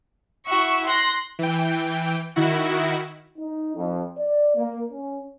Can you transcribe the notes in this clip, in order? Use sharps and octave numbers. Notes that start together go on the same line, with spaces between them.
E4 F#4 E5 C#6
C6 F#6 A#6
E3 G5
D#3 E4 F#4
D#4
F2
D5
A#3
C#4